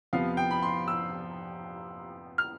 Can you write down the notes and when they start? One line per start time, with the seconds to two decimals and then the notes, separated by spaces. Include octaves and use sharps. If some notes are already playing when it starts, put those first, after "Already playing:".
0.13 F2 C3 F3 B3 F5
0.37 G5
0.51 B5
0.63 C6
0.88 E6
2.38 F6